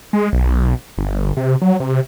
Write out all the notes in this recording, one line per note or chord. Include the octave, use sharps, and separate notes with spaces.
G#3
B1
G1
C3
F#3
C3